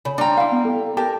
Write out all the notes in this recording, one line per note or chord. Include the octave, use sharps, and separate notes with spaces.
C#3 B5
G3 D4 G5 A#5 C6
E4 F5
B3
A4
G4 A#4 G5 A5